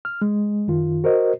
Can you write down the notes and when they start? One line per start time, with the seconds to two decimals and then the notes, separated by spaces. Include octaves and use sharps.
0.05 F6
0.22 G#3
0.68 F#2 D#3 F4
1.04 F#4 A#4 C5 D#5